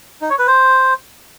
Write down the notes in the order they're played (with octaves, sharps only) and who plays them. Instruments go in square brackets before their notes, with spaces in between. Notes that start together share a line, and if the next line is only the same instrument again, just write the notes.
[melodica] D#4
C#5
B4
C5